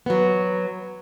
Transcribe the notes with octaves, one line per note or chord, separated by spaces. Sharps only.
F#3 B3